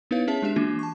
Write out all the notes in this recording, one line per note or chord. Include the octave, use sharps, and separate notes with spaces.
B3 D#4 E4 B4 C#5 F5
C#4 G#4 C#5 E5 A5
G#3 D4 G4 E5 E7
E3 A#3 D4 F4 F#4
A5 C#6